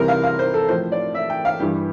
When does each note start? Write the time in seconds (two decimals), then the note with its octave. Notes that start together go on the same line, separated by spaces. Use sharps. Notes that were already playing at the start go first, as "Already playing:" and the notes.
Already playing: C2 C3 E3 G3 A#4
0.08 F5
0.23 F5
0.39 C5
0.54 A4
0.68 A2 F3 C5
0.92 D5
1.15 E5
1.30 G5
1.45 F5
1.60 G2 E3 G3 G4